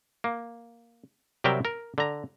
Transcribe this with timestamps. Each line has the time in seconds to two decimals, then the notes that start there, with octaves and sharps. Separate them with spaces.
0.24 A#3
1.44 C3 F#3 G3 A#4 E5 G5
1.65 A#4
1.98 D3 A#5